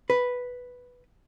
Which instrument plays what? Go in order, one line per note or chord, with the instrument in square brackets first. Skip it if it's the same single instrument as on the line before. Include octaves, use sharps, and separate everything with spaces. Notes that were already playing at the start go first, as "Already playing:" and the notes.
[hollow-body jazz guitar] B4